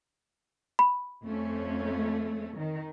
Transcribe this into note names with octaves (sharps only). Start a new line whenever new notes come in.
B5
F2 A3 C#4
D#3